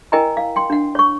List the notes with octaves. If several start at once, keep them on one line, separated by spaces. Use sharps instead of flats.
E4 A#4 D#5 G5 G#5 A#5
F5
G5 C6
D4 F#5
C#5 C#6